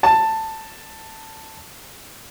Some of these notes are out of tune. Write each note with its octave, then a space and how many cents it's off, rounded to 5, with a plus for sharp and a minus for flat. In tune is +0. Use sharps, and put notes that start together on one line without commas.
A5 +10